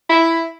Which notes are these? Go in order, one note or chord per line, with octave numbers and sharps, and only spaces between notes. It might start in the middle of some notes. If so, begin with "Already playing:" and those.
E4